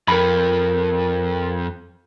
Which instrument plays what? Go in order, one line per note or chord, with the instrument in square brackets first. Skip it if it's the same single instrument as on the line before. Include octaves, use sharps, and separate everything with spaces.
[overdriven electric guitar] F2 [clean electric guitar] A#4 B5